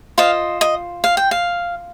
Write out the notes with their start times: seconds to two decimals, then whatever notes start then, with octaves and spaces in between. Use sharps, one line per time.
0.18 F4 C5 D#5 F5
0.61 D#5
1.04 F5
1.17 G5
1.31 F5